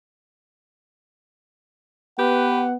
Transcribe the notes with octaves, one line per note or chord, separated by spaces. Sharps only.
B3 G4 B4 F#5